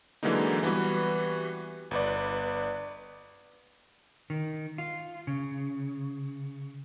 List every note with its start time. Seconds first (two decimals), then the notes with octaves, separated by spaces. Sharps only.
0.23 D3 E3 F#3 G#3 A#3 D#4
0.63 E3 G3 B3 F#4 B4
1.91 G1 B4 D5
4.30 D#3
4.78 F4
5.27 C#3